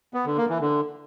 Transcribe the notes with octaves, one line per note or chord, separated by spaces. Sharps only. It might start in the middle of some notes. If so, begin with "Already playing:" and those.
B3
D3
A#3
E3
D3